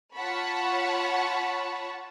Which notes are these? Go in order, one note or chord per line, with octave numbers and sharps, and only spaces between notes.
F4 C#5 F#5 A5 B5 C#6